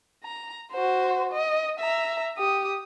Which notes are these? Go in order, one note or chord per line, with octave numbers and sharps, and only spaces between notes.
A#5
F#4 C5
D#5
E5 A#5
G4 D#6